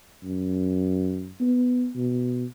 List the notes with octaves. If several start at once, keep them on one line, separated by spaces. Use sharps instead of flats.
F#2
B3
B2